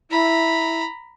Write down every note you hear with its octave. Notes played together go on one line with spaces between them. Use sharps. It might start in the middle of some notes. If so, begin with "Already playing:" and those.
E4 A#5 B5